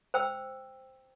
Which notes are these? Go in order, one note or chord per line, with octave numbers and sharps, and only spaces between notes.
C5 G5 E6